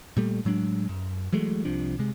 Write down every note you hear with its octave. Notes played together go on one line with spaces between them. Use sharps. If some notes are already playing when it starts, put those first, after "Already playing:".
A#2 G3 A3
A2 F#3 G#3 D4
F#2
E3 F#3 G#3 A3
C2 C3 F3 D4
C3 G#3